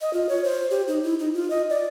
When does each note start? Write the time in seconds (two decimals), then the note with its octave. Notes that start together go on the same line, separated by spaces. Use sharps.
0.01 D#5
0.13 F4
0.29 C#5
0.44 C5
0.71 G4
0.88 D#4
1.03 E4
1.19 D#4
1.34 F4
1.50 D#5
1.70 D5